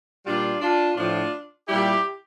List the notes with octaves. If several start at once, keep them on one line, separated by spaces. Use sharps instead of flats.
A#2 G3 D4 F4
D4 F4
A2 F3 D4 F4
A#2 G3 E4 G4